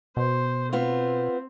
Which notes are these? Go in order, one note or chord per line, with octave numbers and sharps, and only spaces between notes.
B2 C5
B3 C4 F4